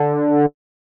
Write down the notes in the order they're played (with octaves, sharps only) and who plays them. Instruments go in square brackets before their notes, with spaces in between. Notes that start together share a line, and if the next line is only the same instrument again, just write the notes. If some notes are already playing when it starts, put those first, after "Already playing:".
Already playing: [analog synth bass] D3